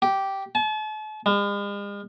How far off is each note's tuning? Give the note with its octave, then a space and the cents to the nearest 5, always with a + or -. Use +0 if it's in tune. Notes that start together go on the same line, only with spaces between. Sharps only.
G4 -10
A5 -40
G#3 -45